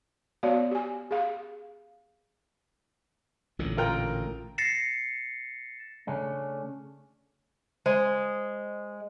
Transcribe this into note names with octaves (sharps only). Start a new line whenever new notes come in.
B3 F#4 C#5 D5 F5
G4 G#5
G#4 F5
A1 A#2 D3
F4 A#4 G5
A6 A#6 C7 C#7 E7
C#3 A3 C#4 D4
G#3 C5